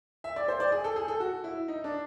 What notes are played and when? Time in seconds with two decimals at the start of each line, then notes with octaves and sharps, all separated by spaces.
0.24 E5
0.36 D5
0.48 C5
0.60 D5
0.72 G#4
0.84 A4
0.96 G#4
1.08 A4
1.20 F#4
1.44 E4
1.68 D#4
1.84 D4